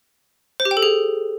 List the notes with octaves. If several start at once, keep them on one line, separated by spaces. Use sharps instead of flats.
C5
G4
G5
A4
G#4